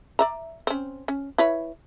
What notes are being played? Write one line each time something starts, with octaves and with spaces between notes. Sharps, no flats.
D5 E5 A#5
C4 C#4
C#4
E4 B4 C#5